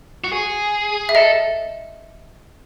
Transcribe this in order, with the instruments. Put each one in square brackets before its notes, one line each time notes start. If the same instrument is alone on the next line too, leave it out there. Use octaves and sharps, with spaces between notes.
[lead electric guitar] F#4
G#4
[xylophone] E5
[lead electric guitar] A4 [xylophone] D#5